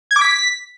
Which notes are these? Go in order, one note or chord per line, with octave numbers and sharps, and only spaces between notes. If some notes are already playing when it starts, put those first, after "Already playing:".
G#6
D6
B6